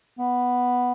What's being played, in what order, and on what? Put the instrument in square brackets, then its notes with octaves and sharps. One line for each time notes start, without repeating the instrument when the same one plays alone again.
[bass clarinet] B3